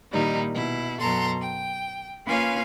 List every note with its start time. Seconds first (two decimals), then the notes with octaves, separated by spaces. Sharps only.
0.12 A#2 D#3 G3 D#4 E4
0.53 B2 E4
1.00 F#2 B2 A4 A#5 C6
1.41 G5
2.25 A#3 C#4 F4 B4 F5 G#5